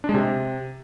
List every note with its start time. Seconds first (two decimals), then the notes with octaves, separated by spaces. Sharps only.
0.04 D4
0.09 G#3
0.14 C3